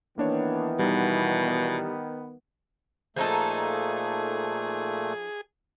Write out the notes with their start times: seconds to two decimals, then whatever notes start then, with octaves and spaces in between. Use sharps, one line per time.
0.18 D#3 E3 A#3 B3 D4 C#5
0.79 B2 G3 D#4
3.16 A#2 F3 A3 D#4 G#4 A4